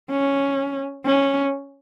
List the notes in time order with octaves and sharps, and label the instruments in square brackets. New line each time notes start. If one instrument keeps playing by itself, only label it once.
[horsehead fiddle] C#4
C#4